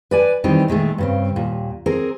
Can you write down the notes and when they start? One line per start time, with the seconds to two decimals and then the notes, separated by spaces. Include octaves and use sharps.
0.11 B4 D5 G#5
0.44 D#3 E3 G3 C4 D#4
0.68 A#2 D#3 G#3 A3
0.98 G2 C#3 C4
1.36 D#2 A#2
1.86 C4 G#4 A#4